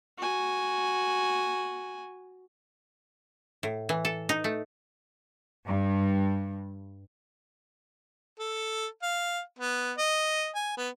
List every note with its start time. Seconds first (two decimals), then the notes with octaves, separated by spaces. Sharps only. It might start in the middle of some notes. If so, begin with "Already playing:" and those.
0.18 F#4 G#5
3.63 A2
3.89 E3
4.05 A4
4.29 D#4
4.44 A3
5.65 G2
8.40 A4
9.03 F5
9.59 B3
9.98 D#5
10.56 G#5
10.77 B3